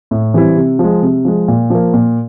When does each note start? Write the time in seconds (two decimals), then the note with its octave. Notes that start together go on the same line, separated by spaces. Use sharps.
0.11 A2
0.34 E3 G3 C4 E4
0.57 C3
0.79 F3 G#3
1.02 C3
1.25 F3 G#3
1.48 A#2
1.70 F3 A#3
1.94 A#2